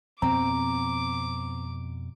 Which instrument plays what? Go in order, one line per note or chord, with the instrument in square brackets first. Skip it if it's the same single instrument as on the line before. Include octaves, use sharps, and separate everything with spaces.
[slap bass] F2 B2 B3 [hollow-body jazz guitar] C4 [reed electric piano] A#5 [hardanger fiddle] D6